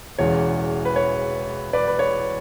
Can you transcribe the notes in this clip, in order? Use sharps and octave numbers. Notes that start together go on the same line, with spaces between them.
E1 E2 C#3 C#5
B4
C#5
B4 D5
B4
C#5